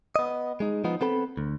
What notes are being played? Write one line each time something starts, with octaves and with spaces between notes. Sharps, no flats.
B3 D#5
G#3 D#4
F3 B3 D#4
B3 C4 A4 B5
D2